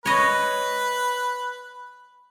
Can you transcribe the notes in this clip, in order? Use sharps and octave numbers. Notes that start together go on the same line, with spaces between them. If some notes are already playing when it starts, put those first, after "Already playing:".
B4 C#5 D#5